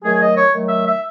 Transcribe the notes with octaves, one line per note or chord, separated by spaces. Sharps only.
D#3 F#3 A3 G#4
D#5
C#5
D#3 F#3 A3
E5
E5